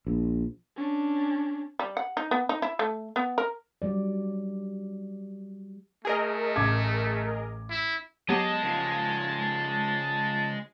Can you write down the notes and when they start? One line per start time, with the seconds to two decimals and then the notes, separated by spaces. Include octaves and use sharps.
0.07 A#1
0.77 C#4 D4
1.79 G3
1.97 F#5
2.17 D#4
2.31 B3
2.49 D#4
2.62 E4
2.79 A3
3.16 B3
3.38 A#4
3.82 F#3 G3 D5
6.05 A3 G#4 A#4 D#5
6.56 A1 D6 G#6
7.71 E4
8.29 F#3 G#3 B3 G4 D#5 A5
8.64 C#3 F3